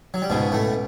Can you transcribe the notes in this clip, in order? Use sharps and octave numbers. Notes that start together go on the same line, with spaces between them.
F#3
G3
C#2 G#2 B2 G#3
A2 A3